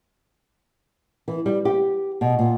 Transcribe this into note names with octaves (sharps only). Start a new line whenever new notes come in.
E3
G3
G4
B2
A#2